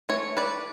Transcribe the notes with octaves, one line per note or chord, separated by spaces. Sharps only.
E3 A3 C#5
B4 D5